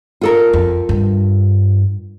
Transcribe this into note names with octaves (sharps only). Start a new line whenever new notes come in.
F4 A4 A#4
F2
G2